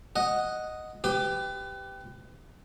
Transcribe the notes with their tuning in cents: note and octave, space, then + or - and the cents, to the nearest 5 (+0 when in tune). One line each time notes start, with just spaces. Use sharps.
D#5 +0 F#5 +0
G4 +0 B4 +30 D6 +0